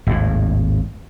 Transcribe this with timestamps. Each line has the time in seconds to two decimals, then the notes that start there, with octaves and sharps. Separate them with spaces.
0.07 G#1 D#2 A2